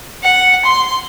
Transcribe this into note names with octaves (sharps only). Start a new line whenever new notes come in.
F#5
C6